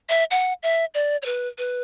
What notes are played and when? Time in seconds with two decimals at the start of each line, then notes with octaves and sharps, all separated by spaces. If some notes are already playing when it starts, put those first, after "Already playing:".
0.09 E5
0.31 F#5
0.63 E5
0.94 D5
1.22 C#5
1.26 B4
1.58 B4